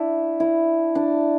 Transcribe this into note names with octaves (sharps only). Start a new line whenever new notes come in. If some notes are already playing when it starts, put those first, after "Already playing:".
Already playing: D4 E4
E4
D4